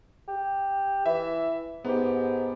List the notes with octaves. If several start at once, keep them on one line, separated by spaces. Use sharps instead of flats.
G4
E3 E5
G#2 B3 G4